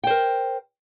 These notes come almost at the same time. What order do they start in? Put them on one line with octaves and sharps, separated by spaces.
G5 C5 A#4